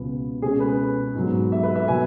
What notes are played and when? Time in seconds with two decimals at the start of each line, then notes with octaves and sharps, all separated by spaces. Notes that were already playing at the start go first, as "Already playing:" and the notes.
Already playing: C#2 B2 B3
0.42 B2 G#3 C#4 G#4
0.60 B4
1.15 G#2 F#3 B3
1.52 E5
1.63 B4
1.76 E5
1.88 B2 F#3 B3 G#5